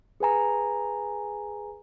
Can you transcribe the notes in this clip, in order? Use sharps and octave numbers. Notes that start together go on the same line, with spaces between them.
G#4 B4 G#5 A#5